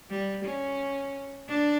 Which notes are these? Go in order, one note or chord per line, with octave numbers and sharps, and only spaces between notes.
G3
C#4
D4